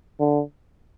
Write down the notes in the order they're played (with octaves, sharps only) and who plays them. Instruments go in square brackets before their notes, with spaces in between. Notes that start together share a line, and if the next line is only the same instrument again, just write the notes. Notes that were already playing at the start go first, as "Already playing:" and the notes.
[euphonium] D3